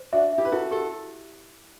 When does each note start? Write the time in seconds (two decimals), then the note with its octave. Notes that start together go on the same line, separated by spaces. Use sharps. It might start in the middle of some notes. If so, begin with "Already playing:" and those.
Already playing: C5
0.12 D4 F#4 E5
0.33 E5
0.38 E4 G4
0.45 B4
0.52 E4 F#4 A4
0.71 F#4 G4 A4